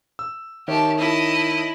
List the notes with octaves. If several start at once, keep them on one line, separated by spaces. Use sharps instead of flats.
E6
D#3 G4 C#5 E5 A5
E4 D#5 A5